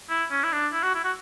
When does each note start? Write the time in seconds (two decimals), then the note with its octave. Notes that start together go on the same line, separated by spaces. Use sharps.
0.10 E4
0.31 C#4
0.44 E4
0.53 D4
0.73 E4
0.83 F#4
0.95 E4
1.04 F#4